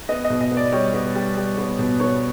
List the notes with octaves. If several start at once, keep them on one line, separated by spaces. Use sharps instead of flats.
B3 D#5
D#5
B2
D#5
B3
D5
G3 C#5
B3
G3
G3
B3
B2
B3 C#5